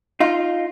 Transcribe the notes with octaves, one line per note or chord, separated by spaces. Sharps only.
D#4 F4